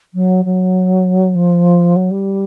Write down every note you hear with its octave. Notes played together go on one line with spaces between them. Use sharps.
F#3
F#3
F3
F#3
G3